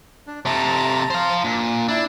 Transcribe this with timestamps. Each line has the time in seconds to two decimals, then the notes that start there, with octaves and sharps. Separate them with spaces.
0.27 D4
0.45 C3 A3 A5 A#5
1.10 C5 F5
1.44 A#2 D4
1.88 D4 E4 E6